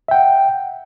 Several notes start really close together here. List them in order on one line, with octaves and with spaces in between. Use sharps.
E5 G5 F#5